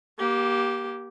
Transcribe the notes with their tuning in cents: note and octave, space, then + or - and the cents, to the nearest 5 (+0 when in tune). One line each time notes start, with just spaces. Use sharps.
A#3 +30 G4 -10